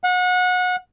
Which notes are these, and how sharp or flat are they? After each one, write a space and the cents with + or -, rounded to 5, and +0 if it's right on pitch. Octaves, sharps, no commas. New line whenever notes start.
F#5 -30